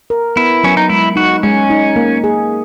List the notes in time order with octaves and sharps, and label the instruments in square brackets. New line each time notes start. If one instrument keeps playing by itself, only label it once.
[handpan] A#4
[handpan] B3 [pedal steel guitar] E4
[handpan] F#3 [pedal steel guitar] C#4
[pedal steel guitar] D#4
[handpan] G#3 [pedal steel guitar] E4
[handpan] D#4 [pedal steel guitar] F#4
[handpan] G#3 [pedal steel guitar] C#4
[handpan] D#4
A#3
G#4